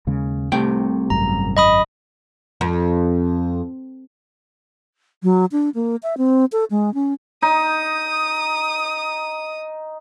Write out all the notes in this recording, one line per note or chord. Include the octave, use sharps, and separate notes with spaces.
D#2 C#3 G#3
C2 C3 A3 G5
G#1 F#2 A#5
D#5 B5 D#6
F2
F#3
D4
A#3
E5
C4
A4
G#3
C#4
D#4 D#6